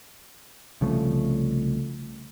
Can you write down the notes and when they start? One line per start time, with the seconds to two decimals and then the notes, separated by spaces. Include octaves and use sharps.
0.81 C2 C#3 F3 A3